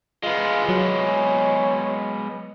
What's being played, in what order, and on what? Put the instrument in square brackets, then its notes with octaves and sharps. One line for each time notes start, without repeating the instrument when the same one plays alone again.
[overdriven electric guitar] G#3 B3 [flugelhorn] F4
[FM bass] F#3 [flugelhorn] C#5